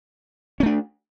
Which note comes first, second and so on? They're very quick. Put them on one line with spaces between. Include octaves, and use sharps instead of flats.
C#4 A3 D4